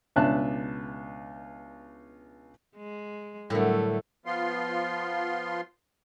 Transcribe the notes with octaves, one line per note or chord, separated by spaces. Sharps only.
C#2 B2 D4 E5 A5 F#6
G#3
A2 D3 F#3 G3 A3 A#4
F3 B3 F4 C6